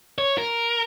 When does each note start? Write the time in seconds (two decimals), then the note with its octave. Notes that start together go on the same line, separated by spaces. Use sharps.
0.18 C#5
0.38 A#4